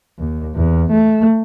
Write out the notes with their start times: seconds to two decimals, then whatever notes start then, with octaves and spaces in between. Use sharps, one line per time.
0.19 D#2
0.55 E2
0.91 A3